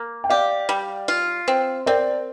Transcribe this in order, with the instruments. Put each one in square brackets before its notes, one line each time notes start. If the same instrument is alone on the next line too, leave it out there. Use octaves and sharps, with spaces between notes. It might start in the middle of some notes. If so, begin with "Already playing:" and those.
Already playing: [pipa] A#3
[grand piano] G5
[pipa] G4 [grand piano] D5 F5
[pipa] G3
F4
C4
[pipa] C4 [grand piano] A#4 D5